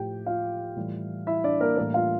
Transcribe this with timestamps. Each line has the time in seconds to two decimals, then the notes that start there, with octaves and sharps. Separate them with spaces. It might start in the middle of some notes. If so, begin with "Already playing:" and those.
Already playing: A2 F3 G4 G5
0.26 F4 F5
0.76 A2 E3 G3
1.27 E4 E5
1.44 D4 D5
1.61 A#3 A#4
1.77 A2 E3 G3 A#3 A#4
1.94 F4 F5